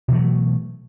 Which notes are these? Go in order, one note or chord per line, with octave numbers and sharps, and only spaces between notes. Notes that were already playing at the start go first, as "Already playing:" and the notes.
B2 E3 F#3 A3